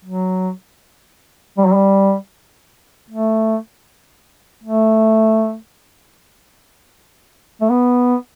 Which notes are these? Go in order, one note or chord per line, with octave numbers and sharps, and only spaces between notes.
F#3
G3
F#3
G3
A3
A3
A3
B3